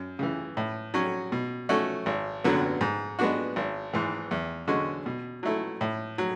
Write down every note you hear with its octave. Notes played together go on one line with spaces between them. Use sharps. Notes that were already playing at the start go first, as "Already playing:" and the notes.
Already playing: F#2
C#3 E3
A2
F#3 C#4
B2
A3 C#4 F#4
G#1
F#2 D3 F#3 B3
G#2
G#3 B3 D4 F#4
G#1
G#2 E3
E2
D3 G#3 C#4 F#4
B2
F#3 A3 E4
A2
F#3